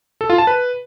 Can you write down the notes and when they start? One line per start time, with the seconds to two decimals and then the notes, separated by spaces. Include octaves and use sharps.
0.21 A4
0.30 F4
0.38 A5
0.47 B4